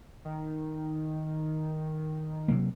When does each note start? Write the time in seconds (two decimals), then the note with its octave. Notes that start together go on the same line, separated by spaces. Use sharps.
0.25 D#3
2.48 C3 F#3 A#3